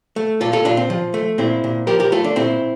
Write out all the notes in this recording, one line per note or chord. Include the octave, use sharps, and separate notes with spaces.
A3
A#2 F4 A4
F4 A4
A#2 D4 F4
C4
F3
A3
A#2 C4 E4
A#2
F3 G4 A#4
G4 A#4
A3 F4 A4
D4
A#2 C4 E4